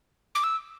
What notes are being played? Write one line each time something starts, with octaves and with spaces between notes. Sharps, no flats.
D6
E6